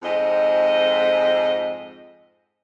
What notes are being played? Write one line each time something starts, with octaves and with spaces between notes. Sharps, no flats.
F2 G#2 C4 D#5